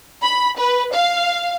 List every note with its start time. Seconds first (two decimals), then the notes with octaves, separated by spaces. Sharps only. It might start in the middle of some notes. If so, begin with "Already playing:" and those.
0.23 B5
0.57 B4
0.92 F5